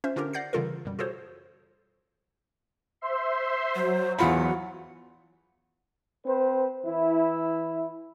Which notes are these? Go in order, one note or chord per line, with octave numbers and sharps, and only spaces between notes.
C#4 F4 C5 E5
D3 C#4 D4 F4 G4 A#4
D5 F#5 G6 A#6 C7
C#3 E3 G3 F4 A4 A#4
F#2 B2 G3
F4 F#4 G#4 A4 C5 C#5
C5 E5 C6
F#3 C5
E2 F4 F#5 B5
C4 B4 C5
E3 E4